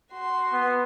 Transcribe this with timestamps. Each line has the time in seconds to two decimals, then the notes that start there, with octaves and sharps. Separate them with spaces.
0.12 F#4 C6
0.53 B3